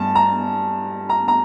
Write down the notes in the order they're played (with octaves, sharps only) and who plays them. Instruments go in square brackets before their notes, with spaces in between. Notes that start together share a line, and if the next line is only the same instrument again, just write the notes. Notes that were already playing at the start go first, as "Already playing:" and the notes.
Already playing: [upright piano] G2 A5
A#5
A#5
A#5